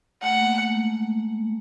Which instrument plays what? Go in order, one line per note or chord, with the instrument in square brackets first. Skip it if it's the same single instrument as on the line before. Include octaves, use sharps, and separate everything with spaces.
[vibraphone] A3 [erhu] F#5
[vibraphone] A#3
A3
G#3